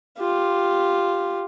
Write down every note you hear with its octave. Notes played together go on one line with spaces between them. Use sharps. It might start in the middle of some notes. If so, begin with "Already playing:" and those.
F4 G4